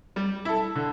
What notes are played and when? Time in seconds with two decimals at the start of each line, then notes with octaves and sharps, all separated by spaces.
0.16 G3
0.45 E4 A4
0.75 D3